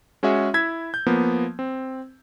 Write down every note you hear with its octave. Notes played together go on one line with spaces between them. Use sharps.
G#3 C#4 F#4 G#4 E5
E4 E6 G#6 B6
G6
F3 A#3 B3
C4